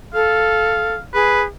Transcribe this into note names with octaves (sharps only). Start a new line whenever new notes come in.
A4 F5
G#4 B4